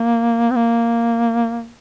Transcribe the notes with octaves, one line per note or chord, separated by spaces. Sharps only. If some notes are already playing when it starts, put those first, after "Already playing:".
Already playing: A#3
C4
A#3